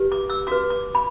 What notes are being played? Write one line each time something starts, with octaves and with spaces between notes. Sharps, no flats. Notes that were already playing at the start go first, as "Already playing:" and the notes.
Already playing: G4 B4
D6
E6
F#4 B4 D6
D6
B5